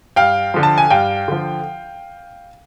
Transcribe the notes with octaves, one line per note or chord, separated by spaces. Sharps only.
G2 F5 G5
D3 F3
A5
G#5
G2 F5 G5
D3 F3